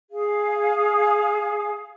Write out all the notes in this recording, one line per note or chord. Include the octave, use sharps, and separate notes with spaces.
G#4 F5